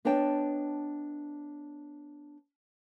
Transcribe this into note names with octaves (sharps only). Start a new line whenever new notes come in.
B3 D4 C#5 D#5 G5 A5